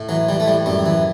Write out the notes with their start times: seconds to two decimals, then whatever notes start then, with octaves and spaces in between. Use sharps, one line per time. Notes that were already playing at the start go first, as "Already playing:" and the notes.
Already playing: A2
0.09 E3 F#3
0.29 E3 G3
0.40 A3
0.47 A2 G3
0.66 F#2 G3
0.86 E3